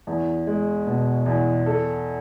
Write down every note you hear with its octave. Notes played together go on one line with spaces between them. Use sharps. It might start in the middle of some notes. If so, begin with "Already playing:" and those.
E2
G#3
B2
E2
A4